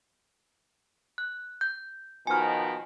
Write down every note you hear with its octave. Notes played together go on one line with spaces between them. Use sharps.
F#6
G6
B2 D#3 F3 G#5 F6